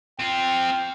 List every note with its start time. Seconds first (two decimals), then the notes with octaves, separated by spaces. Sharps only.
0.20 C4 F4 G5